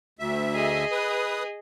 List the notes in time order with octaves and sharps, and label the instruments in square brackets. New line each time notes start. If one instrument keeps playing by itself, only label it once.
[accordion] D2 E5
[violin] G#4 D#5
[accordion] B4 D#6